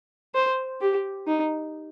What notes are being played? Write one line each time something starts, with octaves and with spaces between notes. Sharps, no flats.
C5
G4
D#4